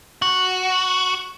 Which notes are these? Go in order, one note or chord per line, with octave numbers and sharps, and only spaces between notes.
F#4